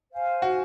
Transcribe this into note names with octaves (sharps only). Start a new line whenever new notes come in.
C5 F5 G#5
F#4